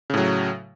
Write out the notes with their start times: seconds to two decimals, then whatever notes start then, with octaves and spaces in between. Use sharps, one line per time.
0.10 C#3
0.14 A2
0.18 F#3